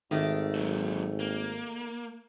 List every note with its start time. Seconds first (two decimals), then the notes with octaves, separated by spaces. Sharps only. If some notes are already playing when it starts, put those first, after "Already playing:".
0.11 G#1 D#3 A3 G4
0.55 A#2 F#3
1.20 A#3